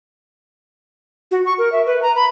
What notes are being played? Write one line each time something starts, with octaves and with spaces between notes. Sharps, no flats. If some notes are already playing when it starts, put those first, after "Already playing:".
F#4
C#6
A#4
E5
B4
A#5
B5